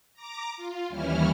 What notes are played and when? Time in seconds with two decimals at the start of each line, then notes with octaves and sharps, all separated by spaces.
0.13 A#5 D6
0.57 F4
0.89 D#2 E3 G3 C#4 E4 F6